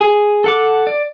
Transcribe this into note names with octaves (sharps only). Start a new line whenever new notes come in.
G#4
A4 F#5 D6
D5